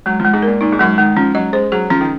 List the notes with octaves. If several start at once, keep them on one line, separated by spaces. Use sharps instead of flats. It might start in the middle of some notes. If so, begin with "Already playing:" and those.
F#3 G#3
F3
G#3
G#2
A#2 A#4
A#2 D#4
G#2
F#2 G#3
D#3 G#3
F3 C#4
F#3 D#5
G#3 C5
F#3 G#4
F3 C#4
D#3